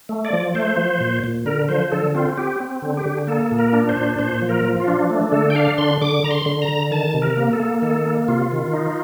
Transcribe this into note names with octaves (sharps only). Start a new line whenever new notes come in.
A3
D5
F3
A3 C5
F3
A#2
A#2
D3 A#4
F3 C5
D3 A4
C4 F4
C4 G4
C4
D3
G4
D3
A#3 A4
A#2
A#4
D4
C5
A#2
A#2 C5
F3
A#4
F3
F4
D4
A3
D3 A4
G5
D4 F5
D3 C6
D3 D6
D3 A#5
C6
D3
A#5
D3
D#3 A5
C3
A#4
A#3
A4
A#3
D#3 A4
A#3
C3 F4
D#3
D#4